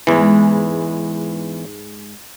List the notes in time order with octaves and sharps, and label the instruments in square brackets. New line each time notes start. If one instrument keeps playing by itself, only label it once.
[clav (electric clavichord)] E2 E3 [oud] G#2 G#3